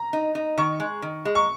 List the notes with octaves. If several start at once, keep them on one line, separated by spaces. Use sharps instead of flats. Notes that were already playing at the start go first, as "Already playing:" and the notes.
Already playing: A#5
D#4
D#4
D#3 C#6
G#3
D#3
G#3
C#6